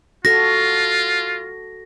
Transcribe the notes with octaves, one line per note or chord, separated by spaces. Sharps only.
F4 F#4 A4 A#6